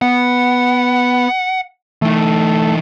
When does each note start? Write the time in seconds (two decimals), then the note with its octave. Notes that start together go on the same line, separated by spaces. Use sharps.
0.02 B3 F#5
2.02 E3 A3 D#4